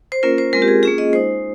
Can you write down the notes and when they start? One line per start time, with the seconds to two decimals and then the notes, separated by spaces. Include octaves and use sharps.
0.12 C5
0.23 A#3 C#4 F4 A#4
0.38 C5
0.53 G#3 C4 F4 A#4
0.62 G4
0.68 G#4
0.83 A#3 C#4 F4 G#4
0.98 D#5
1.13 G#3 D#4 C5